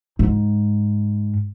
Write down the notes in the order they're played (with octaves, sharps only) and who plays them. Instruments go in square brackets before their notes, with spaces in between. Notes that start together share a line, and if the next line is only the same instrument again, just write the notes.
[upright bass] G#2